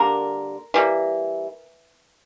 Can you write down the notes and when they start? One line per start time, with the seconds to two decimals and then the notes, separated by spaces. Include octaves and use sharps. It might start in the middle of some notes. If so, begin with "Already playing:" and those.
Already playing: D3 G3 A#3 A#4
0.74 E3 G3 A#3